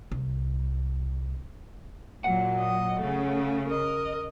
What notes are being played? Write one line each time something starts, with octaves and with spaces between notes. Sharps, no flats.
C2
A#2 F#3 F#5
D#5
C#3 A3
A#4 D#5